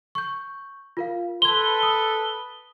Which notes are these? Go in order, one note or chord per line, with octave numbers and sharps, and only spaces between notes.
C#6 G6
F4 A#4 F5
A4 B4 C6 G#6 G7
D#6